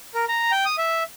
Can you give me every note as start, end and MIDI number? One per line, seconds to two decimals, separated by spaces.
0.14 0.25 70
0.29 0.52 82
0.52 0.65 79
0.65 0.76 87
0.78 1.03 76